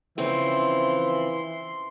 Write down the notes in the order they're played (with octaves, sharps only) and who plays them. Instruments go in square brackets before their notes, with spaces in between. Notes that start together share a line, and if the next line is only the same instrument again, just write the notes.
[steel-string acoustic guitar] C#3 F3 C4 [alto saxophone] E3 [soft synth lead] C6